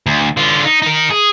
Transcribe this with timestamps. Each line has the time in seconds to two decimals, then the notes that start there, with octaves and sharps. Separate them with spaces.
0.07 D2
0.37 D3 F4
0.65 D#4
0.82 D#4 A#4
1.10 G#4